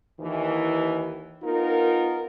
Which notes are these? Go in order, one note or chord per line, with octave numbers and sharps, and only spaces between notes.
D#2 D#3 E3
B3 D#4 F4 A#4